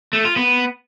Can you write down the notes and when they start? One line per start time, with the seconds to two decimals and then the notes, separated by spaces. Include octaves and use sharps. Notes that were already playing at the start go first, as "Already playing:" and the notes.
0.13 A3
0.25 F4
0.36 B3